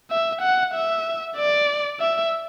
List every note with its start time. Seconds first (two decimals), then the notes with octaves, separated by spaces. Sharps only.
0.11 E5
0.42 F#5
0.74 E5
1.36 D5
2.00 E5